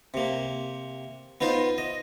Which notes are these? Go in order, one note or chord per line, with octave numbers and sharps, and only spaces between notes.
C3 A#3
B3 D#4 F4 C5
D#5